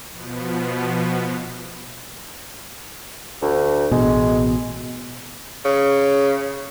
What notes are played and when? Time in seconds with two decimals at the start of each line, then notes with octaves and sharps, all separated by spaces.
0.12 B2 F3 B3
3.42 D2
3.91 A1 B2 G#3
5.65 C#3